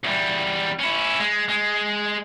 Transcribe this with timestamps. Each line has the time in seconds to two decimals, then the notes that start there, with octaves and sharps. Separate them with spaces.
0.04 E2 G3
0.79 C#4 E4
1.20 G#3
1.49 G#3